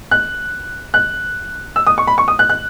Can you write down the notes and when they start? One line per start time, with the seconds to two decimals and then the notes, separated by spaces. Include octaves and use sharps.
0.11 F#6
0.94 F#6
1.76 E6
1.87 D#6
1.98 C#6
2.07 B5
2.18 C#6
2.28 D#6
2.39 F#6
2.49 F#6